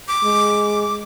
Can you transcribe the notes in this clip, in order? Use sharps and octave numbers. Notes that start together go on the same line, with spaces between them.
D6
G#3